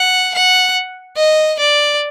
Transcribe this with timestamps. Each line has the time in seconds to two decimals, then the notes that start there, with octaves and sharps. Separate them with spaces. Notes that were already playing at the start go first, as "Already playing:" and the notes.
Already playing: F#5
0.35 F#5
1.17 D#5
1.59 D5